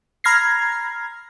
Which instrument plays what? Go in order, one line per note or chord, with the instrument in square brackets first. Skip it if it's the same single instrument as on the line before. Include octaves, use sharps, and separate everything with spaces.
[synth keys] A#5 B5 F6 G#6 A#6 C7